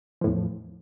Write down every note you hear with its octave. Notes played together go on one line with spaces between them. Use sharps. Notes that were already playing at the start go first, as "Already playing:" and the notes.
E2 A2 F3